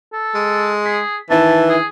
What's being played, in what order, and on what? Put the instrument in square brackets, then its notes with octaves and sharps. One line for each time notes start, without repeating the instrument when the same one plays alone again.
[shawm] A4
[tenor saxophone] G#3
[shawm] G#4 [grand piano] B6
[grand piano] D#3 E4 B4 [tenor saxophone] E3 [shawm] A5
[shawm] G#4